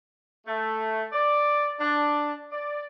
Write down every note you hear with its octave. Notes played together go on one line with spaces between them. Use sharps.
A3
D5
D4
D5